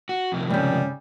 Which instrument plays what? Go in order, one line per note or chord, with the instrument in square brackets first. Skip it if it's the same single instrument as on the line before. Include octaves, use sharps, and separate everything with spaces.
[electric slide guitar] F#4
F2 C3 D#3
[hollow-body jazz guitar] G#2 C#3 [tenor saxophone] G3